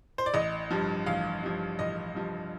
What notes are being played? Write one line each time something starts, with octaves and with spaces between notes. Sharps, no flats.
C5
D5
A1 D#5
G2 F3
A1 F5
G2 F3
A1 D#5
G2 F3